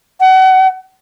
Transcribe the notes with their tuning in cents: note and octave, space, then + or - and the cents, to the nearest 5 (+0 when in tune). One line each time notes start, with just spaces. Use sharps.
F#5 +30